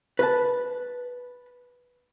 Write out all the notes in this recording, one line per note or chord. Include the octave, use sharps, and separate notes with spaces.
B4 A5